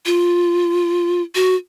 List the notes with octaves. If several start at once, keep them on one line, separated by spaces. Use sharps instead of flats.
F4
F#4